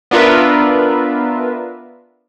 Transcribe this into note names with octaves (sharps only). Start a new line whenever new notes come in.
B3 D4 F4 A#4 B4 E5